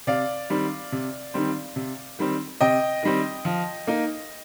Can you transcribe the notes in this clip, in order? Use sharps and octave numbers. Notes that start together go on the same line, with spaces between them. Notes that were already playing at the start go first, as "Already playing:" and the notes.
C3 D5 F5
D#3 G3 C4
C3
D#3 G3 C4
C3
D#3 G3 C4
C3 D#5 G5
D#3 G3 C4
F3
A#3 D#4